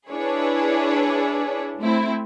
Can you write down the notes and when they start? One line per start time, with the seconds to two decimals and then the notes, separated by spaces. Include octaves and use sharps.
0.10 D4 E4 G#4 B4 C#5
1.79 A3 C4 E4